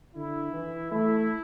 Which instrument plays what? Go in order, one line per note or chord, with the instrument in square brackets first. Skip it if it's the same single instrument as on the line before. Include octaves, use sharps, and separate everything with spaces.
[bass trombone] D3 [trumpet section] E4
[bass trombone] E3
[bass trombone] A3 [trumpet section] E4